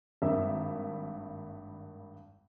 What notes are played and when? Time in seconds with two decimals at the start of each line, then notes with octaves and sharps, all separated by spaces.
0.22 G#1 G2 A#3 E5